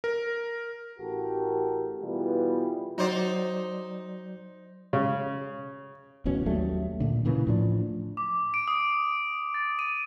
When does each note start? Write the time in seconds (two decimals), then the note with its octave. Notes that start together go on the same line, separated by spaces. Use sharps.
0.04 A#4
0.99 A1 F#4 G4 A4 A#4
2.02 B2 E3 G3 B3 F4 G#4
2.98 F#3 D#4 C5 D5
4.93 C#3
6.25 D1 A1 B2 C#4
6.46 D#2 F#3 G3 A3
7.00 A#2 D3
7.25 A#2 C#3 E3 A#3
7.47 A2 F3 D4
8.17 D6
8.54 D7
8.68 D#6
9.54 A6
9.79 D#7